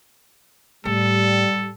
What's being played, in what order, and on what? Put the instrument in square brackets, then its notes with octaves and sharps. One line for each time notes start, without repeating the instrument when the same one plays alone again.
[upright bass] A2 [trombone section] G3 [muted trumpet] A4